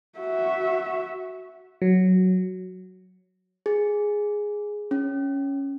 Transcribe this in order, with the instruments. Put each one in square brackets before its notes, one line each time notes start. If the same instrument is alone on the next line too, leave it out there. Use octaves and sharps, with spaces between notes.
[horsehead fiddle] F#4 E5
[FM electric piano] F#3
[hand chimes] G#4
C#4